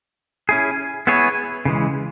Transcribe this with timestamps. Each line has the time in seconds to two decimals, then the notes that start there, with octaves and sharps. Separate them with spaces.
0.49 C#4 E4 G#4
1.07 B3 E4 G#4 C#5
1.65 C#3 E3 G#3